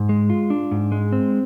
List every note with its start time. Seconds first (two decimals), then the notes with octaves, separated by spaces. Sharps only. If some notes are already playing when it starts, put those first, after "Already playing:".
Already playing: G#2
0.09 G#3
0.30 F4
0.50 D4
0.71 G#2
0.92 G#3
1.12 C4